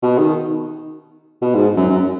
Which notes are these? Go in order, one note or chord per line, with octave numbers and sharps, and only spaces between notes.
B2
D#3
B2
G#2
F#2
F#2